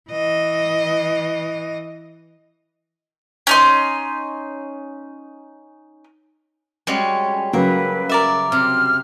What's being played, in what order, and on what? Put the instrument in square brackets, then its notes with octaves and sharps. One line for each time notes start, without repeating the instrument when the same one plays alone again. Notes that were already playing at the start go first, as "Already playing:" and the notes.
[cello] E3 D#5
[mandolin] C#4 D#4 C6
[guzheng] G3 G#3 C#4 [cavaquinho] F#4
[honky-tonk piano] C#3 F#3 [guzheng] A#3 [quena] B4
[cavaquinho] A#4 D5 E5
[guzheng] C3 [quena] F6